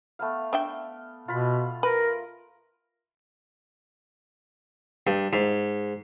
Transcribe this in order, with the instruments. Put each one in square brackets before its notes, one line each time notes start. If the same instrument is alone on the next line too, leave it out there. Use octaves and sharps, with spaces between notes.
[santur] A3 B3 F5
[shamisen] D4 E5 G5
[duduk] B2 [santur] F4 B5
[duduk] A#4 [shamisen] B4
[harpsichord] G2
G#2